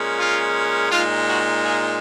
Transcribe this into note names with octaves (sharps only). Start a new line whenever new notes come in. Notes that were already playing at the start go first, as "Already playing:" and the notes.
Already playing: A#2 G#3 C#4
F4
A#2 G#3 D#4 F4
F#4
F4 G#4